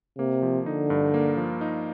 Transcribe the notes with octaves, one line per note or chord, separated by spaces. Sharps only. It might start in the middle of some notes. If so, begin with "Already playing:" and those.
C3 A#3
F3
D3 D#4
G2
A#3
F3
D#4